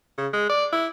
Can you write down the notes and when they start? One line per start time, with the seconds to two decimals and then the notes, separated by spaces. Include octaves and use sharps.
0.18 C#3
0.33 G#3
0.49 D5
0.73 E4